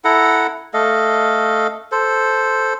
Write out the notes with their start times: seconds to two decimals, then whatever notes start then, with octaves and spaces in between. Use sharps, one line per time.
0.04 E4 A4 F#5 A#5
0.74 A3 A4 D#5 F5
1.92 A4 C5